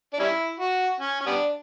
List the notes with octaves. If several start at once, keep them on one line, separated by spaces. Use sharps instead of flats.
D4
G3 C#4 E4
F#4
C#4
C#4
G3 B3 D4